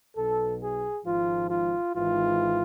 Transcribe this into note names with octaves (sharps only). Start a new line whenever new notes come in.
B1 B2 A4
G#4
G#1 G#2 F3 F4
F4
G#1 G#2 E3 F4